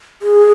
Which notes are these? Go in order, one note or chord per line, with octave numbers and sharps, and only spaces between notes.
G#4